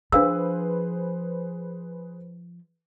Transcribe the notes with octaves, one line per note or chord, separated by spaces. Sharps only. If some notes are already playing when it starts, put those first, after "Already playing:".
F3 D4 G#4 B4 C5 F5 E6